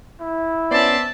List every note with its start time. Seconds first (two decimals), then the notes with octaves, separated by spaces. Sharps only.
0.21 E4
0.71 B3 C#4 C5 D5 E5 A5